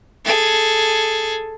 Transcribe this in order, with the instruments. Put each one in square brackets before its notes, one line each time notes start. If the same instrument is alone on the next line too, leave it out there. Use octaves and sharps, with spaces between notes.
[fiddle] G#4 A4